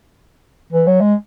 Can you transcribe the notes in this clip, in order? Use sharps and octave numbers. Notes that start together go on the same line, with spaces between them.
E3
F#3
G#3